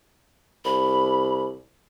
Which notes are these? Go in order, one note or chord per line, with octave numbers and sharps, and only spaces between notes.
C2 B5